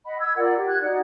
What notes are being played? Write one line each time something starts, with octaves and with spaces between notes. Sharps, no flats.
D#5 F#5 B5
E6 G#6
F4 A#4 D5 F#5
G4
F#6 G#6
D#4 F#4 D5 F#5